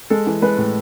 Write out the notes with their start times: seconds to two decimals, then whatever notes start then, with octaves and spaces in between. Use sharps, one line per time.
0.10 G#3 A4
0.27 E3
0.42 G#3 B4
0.58 A2